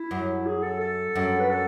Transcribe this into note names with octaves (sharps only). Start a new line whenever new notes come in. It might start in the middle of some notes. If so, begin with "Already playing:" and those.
Already playing: E4
F#2
G#4
A4
A4
F#2
B4
A4